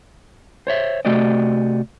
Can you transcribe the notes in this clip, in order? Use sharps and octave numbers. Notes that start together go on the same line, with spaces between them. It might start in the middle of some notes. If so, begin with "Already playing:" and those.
C5 C#5 E5
C3 A3 F#4 G4 D5 D#5